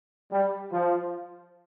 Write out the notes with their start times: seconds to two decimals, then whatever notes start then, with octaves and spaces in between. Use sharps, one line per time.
0.31 G3
0.71 F3